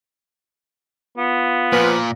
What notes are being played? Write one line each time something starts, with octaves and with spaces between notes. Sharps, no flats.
B3 F4
A#2 F3 B4